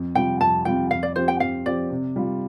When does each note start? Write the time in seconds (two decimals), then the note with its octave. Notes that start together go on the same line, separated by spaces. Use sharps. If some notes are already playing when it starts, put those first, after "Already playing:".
Already playing: F2
0.15 C3 G3 F4 G5
0.41 F2 A5
0.65 C3 G3 F4 G5
0.90 F2 F5
1.03 D5
1.16 F3 C4 G4 C5
1.28 G5
1.40 F2 F5
1.66 F3 C4 G4 D5
1.90 C3
2.16 G3 F4